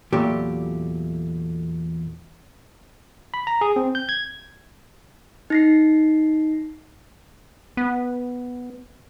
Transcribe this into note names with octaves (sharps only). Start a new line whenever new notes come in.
E2 A#2 F#3 A3 G4
B5
A#5
G#4
C4
G6
G#6
D#4 A#6 C7
B3